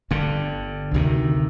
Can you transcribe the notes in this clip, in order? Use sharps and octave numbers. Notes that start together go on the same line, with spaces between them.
G1 G2 D3
D2 C3 D#3